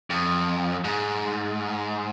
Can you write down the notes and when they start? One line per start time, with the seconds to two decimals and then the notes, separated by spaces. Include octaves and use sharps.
0.10 F2
0.84 G#2